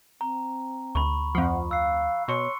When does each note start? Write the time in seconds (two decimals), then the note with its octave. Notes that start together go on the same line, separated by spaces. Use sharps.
0.21 C4 A#5
0.95 D2 B5 C#6
1.35 F2 F3 F#5
1.71 F5 E6 F#6 C7
2.28 B2 C#5 C6 C#6 C#7